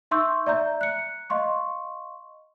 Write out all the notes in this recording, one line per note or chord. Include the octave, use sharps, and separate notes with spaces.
D#4 E5 C6 C#6 E6 G6
D5 E5 A#5 G6
F#6 C#7
D#5 F5 C6 C#6